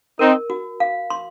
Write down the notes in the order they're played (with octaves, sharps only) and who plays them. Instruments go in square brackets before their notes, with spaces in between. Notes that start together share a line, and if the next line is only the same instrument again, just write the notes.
[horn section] C4 D#4 [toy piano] A#4
[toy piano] F#4
F5
C6